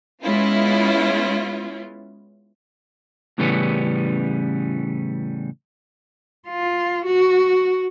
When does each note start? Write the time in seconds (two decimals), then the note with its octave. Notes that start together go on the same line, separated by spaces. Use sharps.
0.23 G#3 B3 C#4 E4 F4
3.38 A2 C#3 E3 G3 B3 C#4
6.48 F4
7.06 F#4